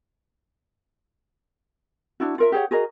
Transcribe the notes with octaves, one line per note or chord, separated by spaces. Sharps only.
D4 E4 F#4
F4 A#4 E5
G4 G#4 C#5 F#5
F#4 G#4 A#4 D#5